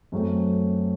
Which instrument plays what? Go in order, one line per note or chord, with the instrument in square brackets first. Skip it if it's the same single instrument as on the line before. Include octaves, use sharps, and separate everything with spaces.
[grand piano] F#2 F#3 A3 C4